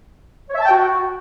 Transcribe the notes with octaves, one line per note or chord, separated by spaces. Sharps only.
C#5
E5
A5
G5
F#4